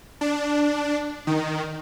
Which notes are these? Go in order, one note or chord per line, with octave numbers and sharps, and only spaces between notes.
D4
D#3